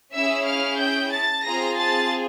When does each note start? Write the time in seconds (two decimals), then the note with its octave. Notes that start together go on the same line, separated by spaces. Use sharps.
0.14 C#4 E4 G#4 E5 E6
0.46 F5 F6
0.79 G5 G6
1.12 A5 A6
1.45 C4 F4 G#4 A#5 A#6
1.78 A5 A6